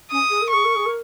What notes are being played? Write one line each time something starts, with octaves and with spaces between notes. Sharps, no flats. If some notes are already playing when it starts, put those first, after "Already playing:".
C#4 D#6
G#4
A#4
G#4 C#6
A#4
G#4
A#4